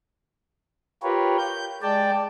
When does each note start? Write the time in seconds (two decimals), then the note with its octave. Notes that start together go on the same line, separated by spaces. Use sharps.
1.03 F4 G4 A#4 B4 C#5
1.38 G6
1.82 G#3 D5 G5 A5